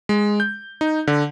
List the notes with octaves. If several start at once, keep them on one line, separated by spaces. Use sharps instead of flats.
G#3
G6
D#4
D3